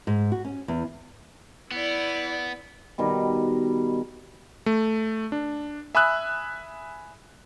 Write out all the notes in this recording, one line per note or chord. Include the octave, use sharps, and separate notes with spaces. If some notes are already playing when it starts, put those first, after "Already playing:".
G#2
F#4
C#4
E2
B3 E4 D5
B2 D#3 G3
A3
D4
E5 G#5 B5 D#6 E6 F#6